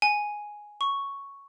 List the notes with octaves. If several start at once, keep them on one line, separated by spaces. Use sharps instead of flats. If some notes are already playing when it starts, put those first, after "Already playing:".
G#5
C#6